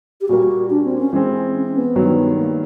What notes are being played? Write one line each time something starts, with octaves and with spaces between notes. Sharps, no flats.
G4
A#2 G3 A#3 F#4
D4
C4
C#4
E3 G#3 C4
C#4
B3
G2 D#3 F#3
A#3